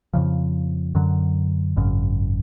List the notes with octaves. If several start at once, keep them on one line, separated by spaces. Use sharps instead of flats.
F2 C#3 F3
F#2 D3 F#3
G#1 F#2 C#3